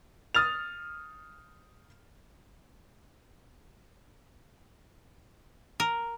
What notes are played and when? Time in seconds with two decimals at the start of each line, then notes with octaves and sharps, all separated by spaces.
0.35 D#6 F6 A6 F7
5.80 A#4